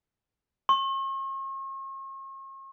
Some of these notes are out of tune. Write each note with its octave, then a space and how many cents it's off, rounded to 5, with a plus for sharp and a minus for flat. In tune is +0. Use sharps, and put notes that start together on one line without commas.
C#6 -45